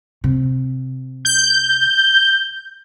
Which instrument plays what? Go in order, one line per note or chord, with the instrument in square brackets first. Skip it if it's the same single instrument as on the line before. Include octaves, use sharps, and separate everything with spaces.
[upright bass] C3
[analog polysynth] G6